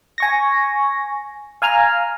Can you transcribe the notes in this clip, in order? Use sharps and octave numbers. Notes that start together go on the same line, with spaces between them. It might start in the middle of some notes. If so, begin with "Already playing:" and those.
G#5 C#6 A#6
F5 G#5 A#5 F6